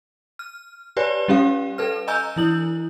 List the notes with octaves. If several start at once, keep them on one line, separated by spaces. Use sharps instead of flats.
F6
G4 B4 C#5 D5 G#5
G3 C#4 G4 F5
A4 B4 F6
D#5 G#5 A#5 E6 G6
E3 E4 F#7